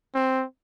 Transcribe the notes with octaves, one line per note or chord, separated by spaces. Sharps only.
C4